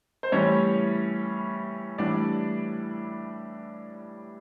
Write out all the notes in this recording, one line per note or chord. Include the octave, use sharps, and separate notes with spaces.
C5
A2 E3 G3 C#4 C#5
A2 E3 G3 D4 D5